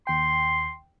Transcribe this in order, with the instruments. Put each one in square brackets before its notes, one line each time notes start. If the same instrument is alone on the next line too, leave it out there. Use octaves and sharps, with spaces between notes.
[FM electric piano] D#2 G5 [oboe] C6